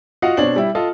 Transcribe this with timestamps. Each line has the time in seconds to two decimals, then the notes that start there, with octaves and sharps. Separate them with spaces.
0.22 F4 F#4 D#5 F5 F#5
0.37 B2 C4 D4 C#5 F#7
0.56 G3 E4
0.75 F4 A4 D#5